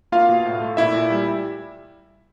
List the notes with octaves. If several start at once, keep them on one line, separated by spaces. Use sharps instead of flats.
A#3 F4 F5
B2
A2
A3
A#2 E4 E5
A#2
G3